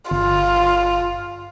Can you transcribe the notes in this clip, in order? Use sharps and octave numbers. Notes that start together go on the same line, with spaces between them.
G1 F4